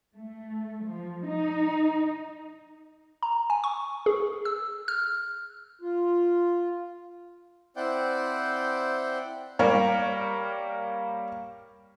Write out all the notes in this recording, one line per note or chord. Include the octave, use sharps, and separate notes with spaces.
A3
F3
D#4
A#5
G#5
C#6
G#4
E6
F6
F4
C4 E4 C5 D5 F#5 G5
G3 A#3 A#4 C#5